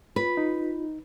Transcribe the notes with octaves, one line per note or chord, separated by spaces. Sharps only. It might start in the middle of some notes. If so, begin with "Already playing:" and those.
F4 B4
D#4